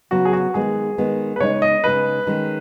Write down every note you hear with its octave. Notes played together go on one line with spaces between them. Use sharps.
C#3 F#3 B3 F#4
G#4
F#4
D#3 G#3 B3 G#4
D#3 G#3 B3
B4
C#3 G#3 D#4 C#5
D#5
C#3 G#3 D#4 B4
D#3 G#3 C#4